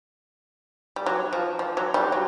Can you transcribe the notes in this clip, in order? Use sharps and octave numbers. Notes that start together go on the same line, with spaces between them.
G3
F#3
F3
F3
F#3
G3
F#3